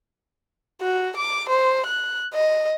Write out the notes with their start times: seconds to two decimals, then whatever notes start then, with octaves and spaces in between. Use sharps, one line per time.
0.81 F#4
1.17 D6
1.50 C5
1.86 F#6
2.34 D#5